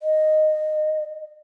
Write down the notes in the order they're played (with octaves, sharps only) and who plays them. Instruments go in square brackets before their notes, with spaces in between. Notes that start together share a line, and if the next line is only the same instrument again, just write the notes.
[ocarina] D#5